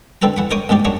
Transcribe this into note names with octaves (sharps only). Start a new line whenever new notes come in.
D3 G3 C4 A4 B4 A#5
E3 F#5 B5
A#4 C5 C#5 D#5 D6 D#6
A#1 G#2 G#3 G4 D5
F#2 D4 C#5 F#5 A#5